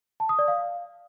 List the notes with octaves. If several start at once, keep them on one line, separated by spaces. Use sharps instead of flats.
A5
D#6
D5
F5